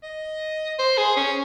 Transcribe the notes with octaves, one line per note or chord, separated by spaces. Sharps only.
D#5
C5
G#4
C#4